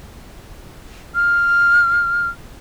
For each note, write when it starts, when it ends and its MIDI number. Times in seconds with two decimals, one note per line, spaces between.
1.15 2.28 89